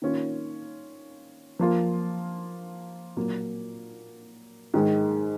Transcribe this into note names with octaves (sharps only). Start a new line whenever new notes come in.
D#3 A#3 C#4 F4
F3 A#3 F4
A#2 F#3 A#3
G#2 D#3 G#3